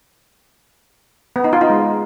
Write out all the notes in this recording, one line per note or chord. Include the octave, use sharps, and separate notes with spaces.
B3
D#4
F4
D#4
G#3